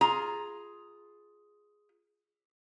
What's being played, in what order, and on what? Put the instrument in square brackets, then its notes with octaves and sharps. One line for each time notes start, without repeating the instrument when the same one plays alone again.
[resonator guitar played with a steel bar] F4 G#4 A#5